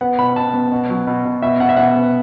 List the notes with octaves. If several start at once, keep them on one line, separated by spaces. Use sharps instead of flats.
B3 F#5
B2 B5
B2 A5
B3
B2
F#3
B2
B2
B2 E5
B2 F#5
E5
B2 F#5
B3